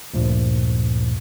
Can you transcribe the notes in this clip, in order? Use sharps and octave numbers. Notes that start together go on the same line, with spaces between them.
D2 G2 A#2 F3